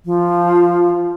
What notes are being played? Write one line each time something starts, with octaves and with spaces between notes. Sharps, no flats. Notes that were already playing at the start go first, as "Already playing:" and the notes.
F3